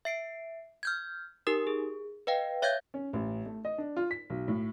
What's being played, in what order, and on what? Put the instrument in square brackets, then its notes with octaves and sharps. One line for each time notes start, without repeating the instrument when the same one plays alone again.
[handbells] E5 C7 D7
F6 G6 G#6
D#4 G4 A#4 D#6
G#4
B4 D#5 F5 G5
C#5 E5 F5 G6 G#6
[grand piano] C#4
A1
A3
D#5
D4
F4
B6
B1
A2